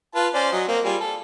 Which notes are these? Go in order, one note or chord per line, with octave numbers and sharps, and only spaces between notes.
F4 B4 A5
C#4 C5 D5
F#3 D#5
A#3 C4
G3 F4 G#4
A4